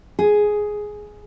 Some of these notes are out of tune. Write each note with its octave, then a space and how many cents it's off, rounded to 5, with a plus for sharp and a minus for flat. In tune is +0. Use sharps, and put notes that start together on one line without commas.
G#4 +5